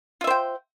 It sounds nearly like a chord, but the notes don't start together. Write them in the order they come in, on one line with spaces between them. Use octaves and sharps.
F4 E5 C5 G5